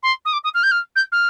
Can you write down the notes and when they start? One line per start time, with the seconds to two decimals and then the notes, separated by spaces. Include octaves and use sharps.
0.03 C6
0.25 D#6
0.33 D6
0.44 D#6
0.54 F6
0.63 G6
0.71 F6
0.96 G6
1.12 F6